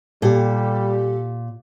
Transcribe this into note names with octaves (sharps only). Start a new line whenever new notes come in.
A#2 G3 G4 A4